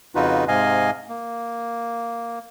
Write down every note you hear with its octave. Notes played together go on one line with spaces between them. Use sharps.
F2 C#3 D#4 F4 F#4 B4
G#2 C3 D#5 F5 G#5
A#3